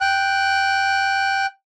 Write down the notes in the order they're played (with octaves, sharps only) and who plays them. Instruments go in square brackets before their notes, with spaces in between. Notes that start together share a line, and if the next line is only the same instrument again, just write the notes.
[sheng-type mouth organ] G5 F#6